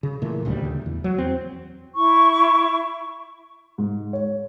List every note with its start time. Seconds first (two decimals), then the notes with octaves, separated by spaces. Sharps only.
0.03 C#3
0.22 A#2 E3 A3
0.45 D#1 D2 C#3 G3
0.86 E2
1.04 F#3
1.18 E2 C4
1.95 E4 C#6
3.78 G#2
4.13 C#5